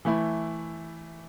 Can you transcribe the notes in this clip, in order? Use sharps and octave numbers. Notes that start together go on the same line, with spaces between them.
E3 A3 E4